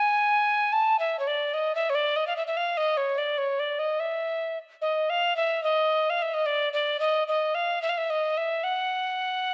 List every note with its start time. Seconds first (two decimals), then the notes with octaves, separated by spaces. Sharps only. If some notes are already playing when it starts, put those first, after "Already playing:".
Already playing: G#5
0.73 A5
0.99 E5
1.19 C#5
1.27 D5
1.54 D#5
1.75 E5
1.90 C#5
1.95 D5
2.16 D#5
2.27 F5
2.37 E5
2.47 E5
2.57 F5
2.77 D#5
2.97 C#5
3.18 D5
3.38 C#5
3.59 D5
3.79 D#5
4.00 E5
4.82 D#5
5.10 F5
5.36 E5
5.63 D#5
6.10 F5
6.22 E5
6.34 D#5
6.46 D5
6.73 D5
7.00 D#5
7.28 D#5
7.55 F5
7.82 E5
7.89 F5
7.98 E5
8.10 D#5
8.37 E5
8.64 F#5